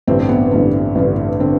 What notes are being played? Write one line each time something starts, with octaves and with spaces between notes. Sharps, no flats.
A1 G2 D3 C4
B3
A1 G2 D3
A1 G2 D3
D3 C4